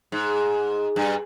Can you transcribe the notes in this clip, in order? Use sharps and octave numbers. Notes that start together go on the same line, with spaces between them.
G#2
G2